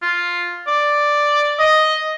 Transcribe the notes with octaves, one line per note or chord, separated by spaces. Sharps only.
F4
D5
D#5